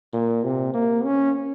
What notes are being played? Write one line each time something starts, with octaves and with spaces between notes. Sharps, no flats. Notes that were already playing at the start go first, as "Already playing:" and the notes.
A#2
C3
A#3
C#4